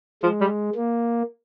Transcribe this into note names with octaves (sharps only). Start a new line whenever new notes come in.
F3 G#3
G3
A#3